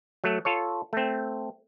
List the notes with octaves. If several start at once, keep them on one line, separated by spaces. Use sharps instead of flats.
F#3 A3
F4 A4 C#5
A3 C4